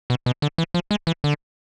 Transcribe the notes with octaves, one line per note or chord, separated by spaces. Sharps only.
B2
B2
D3
E3
F3
G#3
E3
D3